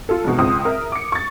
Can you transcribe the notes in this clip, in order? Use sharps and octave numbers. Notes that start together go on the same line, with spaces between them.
F4 A4
C2 G#2 B2
C#2 C4 D#6
A#4 E5
D6 C#7
C#6 A6